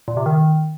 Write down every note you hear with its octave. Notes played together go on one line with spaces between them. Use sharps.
A#2
C3
D#3